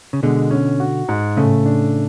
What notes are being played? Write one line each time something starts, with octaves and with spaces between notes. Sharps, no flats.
C#3
B2 D3 G#3
C#4
F#4
G#2
A2 C#3 A3
D4